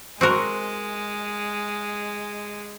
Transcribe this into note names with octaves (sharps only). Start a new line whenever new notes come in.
G#3 C4 F#4 A#4